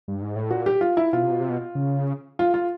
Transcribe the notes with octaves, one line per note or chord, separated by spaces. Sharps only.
G2
G#2
A2
A#2 F#4
G4
F4
E4
B2 F4
C3
B2
C3
B2
C#3
F4
F4